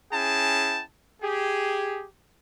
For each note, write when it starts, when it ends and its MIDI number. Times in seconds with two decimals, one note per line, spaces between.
0.11 0.81 61
0.11 0.81 64
0.11 0.81 68
0.11 0.81 79
0.11 0.81 81
1.21 2.04 67
1.21 2.04 68